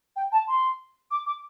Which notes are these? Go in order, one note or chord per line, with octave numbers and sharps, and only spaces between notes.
G5
A5
C6
D6
D6